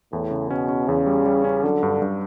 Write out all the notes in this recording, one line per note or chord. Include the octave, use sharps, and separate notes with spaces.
E2 A2
C#3
B2 C#4
C#4
E2 C#3
G3
G3
C#4
D3 F#3
G2
G2